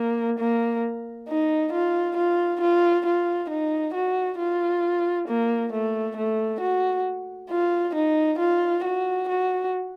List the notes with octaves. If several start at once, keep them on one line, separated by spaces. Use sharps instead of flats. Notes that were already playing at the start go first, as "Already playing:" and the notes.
Already playing: A#3
A#3
D#4
F4
F4
F4
F4
D#4
F#4
F4
A#3
A3
A3
F#4
F4
D#4
F4
F#4
F#4